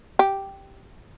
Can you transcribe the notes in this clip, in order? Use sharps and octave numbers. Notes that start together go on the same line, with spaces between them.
G4